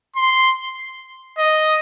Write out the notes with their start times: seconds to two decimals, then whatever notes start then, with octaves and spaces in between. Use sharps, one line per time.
0.16 C6
1.38 D#5